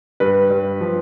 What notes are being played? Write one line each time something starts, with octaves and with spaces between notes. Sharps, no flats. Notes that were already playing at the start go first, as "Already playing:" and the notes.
G2 B4
G2
F3